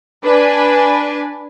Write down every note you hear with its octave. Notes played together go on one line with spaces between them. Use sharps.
D4 B4 G#5